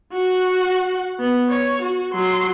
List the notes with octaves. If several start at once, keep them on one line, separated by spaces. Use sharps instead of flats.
F#4 F#5
B3
C#5
F#4
F#3 C6